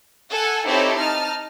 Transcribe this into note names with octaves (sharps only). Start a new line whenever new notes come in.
A4 F#5 G#5
C4 D#4 E4 G4 A4 C#5
D#4 A5 F6